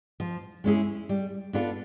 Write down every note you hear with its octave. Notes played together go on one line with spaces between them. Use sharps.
F3
G#3 C#4 E4 G#4
G3
B3 D4 F4 A4